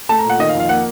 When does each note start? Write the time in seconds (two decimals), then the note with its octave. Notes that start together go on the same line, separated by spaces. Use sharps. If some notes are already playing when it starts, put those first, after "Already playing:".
0.09 A3 A5
0.19 A#5
0.24 A#2
0.30 F#5
0.39 D#3 D#5
0.49 F5
0.55 F2
0.60 F5
0.69 A#3 F#5